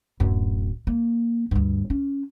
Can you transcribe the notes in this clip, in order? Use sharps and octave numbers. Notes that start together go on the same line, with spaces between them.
D1 F#2
A#3
D2 G2
C#4